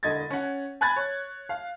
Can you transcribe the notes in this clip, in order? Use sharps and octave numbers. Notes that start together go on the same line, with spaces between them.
E1 D3 D#5 G#6 A6
C#4 F#5
G#5 B5 F#6 G#6 A6
C#5
F5